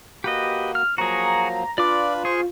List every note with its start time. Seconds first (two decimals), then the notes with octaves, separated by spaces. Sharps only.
0.24 A#3 F#4 G4 B4 D#5
0.75 F6
0.98 F3 F#3 A#3 F#4 G#4 A#5
1.78 D4 F4 B4 D5 B5 D6
2.25 G#4 C5 C#6